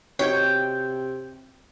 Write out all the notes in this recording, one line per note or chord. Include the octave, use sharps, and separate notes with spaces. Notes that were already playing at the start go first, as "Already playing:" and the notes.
C3 D#4 F#4 C#5 G5